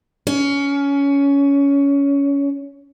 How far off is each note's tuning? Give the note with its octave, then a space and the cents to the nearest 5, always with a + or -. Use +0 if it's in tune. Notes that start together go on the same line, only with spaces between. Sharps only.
C#4 +20